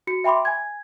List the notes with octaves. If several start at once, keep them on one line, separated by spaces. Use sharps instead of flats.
F#4 C#7
E5 G5 B5 C6 D6
G#5 G#6